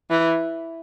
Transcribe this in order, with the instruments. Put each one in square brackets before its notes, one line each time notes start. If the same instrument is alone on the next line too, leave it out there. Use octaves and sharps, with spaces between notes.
[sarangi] E3